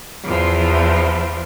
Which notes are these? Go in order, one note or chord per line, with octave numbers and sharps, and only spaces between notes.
E2 F3